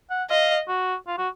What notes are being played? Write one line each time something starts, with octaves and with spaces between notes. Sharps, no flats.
F#5
D#5 F5
F#4
F4
F#4